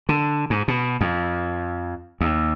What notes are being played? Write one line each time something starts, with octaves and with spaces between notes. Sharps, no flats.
D3
G#2
B2
F2
D#2